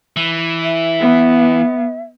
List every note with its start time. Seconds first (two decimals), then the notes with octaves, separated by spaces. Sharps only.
0.16 E3
0.63 E5
1.01 B3